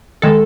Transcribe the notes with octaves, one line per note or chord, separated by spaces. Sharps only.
D#3 G#3 A4